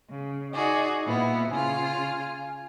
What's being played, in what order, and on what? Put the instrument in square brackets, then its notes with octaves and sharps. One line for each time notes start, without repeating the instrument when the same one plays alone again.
[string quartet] C#3
[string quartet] D#4 F#4 G#4 [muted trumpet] D5
[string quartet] A#2 B3 [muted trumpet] E4
[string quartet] C#3 F4 F6 [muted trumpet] G#5